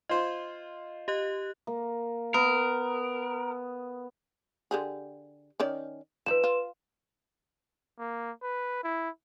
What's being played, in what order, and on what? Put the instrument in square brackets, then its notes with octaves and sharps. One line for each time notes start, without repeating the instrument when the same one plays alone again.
[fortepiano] F4 C5 [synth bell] D#5
[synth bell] G4 D#5 F#6
[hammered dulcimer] A#3
[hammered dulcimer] B3 [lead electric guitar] A#4
[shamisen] D3 G4 G#4
D#3 C#4 D5
[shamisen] F3 D#4 [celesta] B4 E7
[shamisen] F4
[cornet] A#3
B4
E4